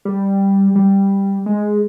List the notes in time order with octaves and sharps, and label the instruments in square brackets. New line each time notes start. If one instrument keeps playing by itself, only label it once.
[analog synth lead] G3
G3
G#3